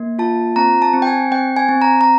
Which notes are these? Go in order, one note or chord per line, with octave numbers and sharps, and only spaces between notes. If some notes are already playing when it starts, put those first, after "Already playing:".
Already playing: A#3
F4 A5
C4 A#5
A5
C4
G5
G#5
C4 G5
G#5
C4
A#5
A#5